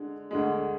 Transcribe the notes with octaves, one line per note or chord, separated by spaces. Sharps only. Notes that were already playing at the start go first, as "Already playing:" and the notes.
Already playing: D3 G#3
D2 D3 G#3